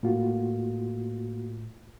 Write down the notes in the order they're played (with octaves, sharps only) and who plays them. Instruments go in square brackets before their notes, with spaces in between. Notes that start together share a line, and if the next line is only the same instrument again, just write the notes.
[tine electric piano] A2 [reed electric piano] A#3 F4 F#4